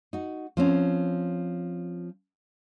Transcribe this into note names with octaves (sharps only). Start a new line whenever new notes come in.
D#4 F#4
F3 C4 C#4